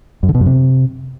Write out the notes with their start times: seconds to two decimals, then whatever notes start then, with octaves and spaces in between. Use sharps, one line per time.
0.23 F#2
0.29 D3
0.35 B2
0.40 F#2
0.46 C3